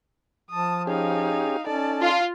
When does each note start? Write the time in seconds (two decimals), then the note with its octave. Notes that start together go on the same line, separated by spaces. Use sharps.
0.50 F3 A5 D#6
0.87 C#4 D#4 G4 G#4 F5
1.67 C#4 D#4 A4 D5 A5
2.01 F4